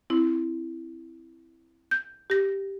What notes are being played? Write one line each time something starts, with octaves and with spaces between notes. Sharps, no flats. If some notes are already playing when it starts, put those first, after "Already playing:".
C4 E4
G6
G4 A#6